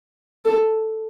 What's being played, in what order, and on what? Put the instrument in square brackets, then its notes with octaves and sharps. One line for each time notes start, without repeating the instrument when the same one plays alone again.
[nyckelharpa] A4